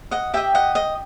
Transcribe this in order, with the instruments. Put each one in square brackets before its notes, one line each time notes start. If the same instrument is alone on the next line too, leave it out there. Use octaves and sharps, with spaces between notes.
[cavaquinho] D#5 F#5
G4 D#5 E5 G5
D#5 F#5
D#5